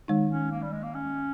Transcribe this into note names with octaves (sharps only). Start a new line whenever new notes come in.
D#3 G#3 D#4
C#4
A#3
G3
G#3
A#3
C#4